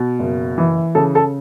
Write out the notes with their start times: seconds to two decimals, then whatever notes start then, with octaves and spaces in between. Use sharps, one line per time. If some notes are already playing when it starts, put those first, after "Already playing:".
Already playing: B2
0.19 F#1
0.58 E3
0.95 C#3 A4
1.15 A4